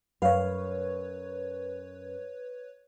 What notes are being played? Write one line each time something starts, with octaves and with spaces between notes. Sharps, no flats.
F#2 B4 C#5 F5